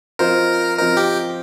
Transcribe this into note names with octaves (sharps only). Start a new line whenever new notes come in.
F3 C4 F4 A#4 C5 D#5
F3 C4 F4 A#4 C5 D#5
G4